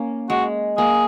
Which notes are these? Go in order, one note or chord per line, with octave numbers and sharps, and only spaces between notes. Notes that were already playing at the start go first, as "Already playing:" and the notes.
Already playing: A#3 C#4
G#3 F#4
A#3 G#4